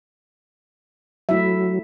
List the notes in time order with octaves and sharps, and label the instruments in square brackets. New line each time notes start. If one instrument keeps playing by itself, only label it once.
[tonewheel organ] F#3 [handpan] A3 E4 E5